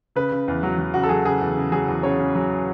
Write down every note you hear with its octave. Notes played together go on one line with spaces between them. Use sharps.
C#3 B4
C#3
E2
F#3
F#3
C#3 F#4
A4
F#3 G#4
C#3 G#4
E2
C#3
F#3 G#4
E2
C#3 C#5
C#3
F#3